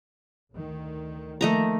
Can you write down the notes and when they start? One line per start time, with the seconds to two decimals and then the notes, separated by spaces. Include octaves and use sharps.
0.53 D2 D#3
1.41 D#3 F3 A3 A#3 D#5 A#5